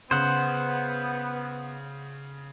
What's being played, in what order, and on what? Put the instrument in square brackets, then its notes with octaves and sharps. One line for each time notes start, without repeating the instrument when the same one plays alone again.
[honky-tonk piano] C#3 [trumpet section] B3 [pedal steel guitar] C5 F#5